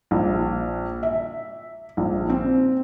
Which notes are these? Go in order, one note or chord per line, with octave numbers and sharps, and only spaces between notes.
A#1
E5
A#1
C4